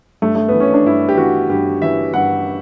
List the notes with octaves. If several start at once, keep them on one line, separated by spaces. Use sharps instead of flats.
G2 A3
A3
B3
E3
C#4
D4
G2 E4
G4
E3 F#4
G2 G4
E3 E5
G2 F#5